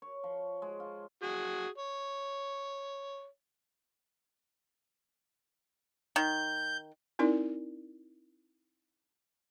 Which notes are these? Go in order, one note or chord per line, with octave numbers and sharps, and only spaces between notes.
C#5
F3
G#3
F4
F#4 G#4
C#5
D#3 G6
C4 D#4 E4 A#4 D5